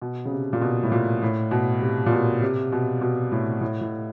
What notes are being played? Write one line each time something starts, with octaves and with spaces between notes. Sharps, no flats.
B2
C#3
C3
A#2
B2
A2
A#2
A2
B2
C3
A#2
B2
C3
B2
B2
A2
A2
A2